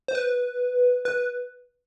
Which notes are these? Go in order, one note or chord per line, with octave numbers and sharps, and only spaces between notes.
C5
B4
B4